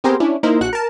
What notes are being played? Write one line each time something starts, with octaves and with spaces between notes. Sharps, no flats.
B3 C4 G4 G#4 A#4 C5
C#4 D4 E4
A#3 D#4 E4 A#4 C5
A#1 F#4 F#6 C#7
A#4 A5